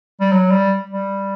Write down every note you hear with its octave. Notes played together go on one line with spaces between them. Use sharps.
G3
F#3
G3
G3